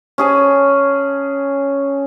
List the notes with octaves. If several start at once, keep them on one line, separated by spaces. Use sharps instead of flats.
C#4 G#4 A5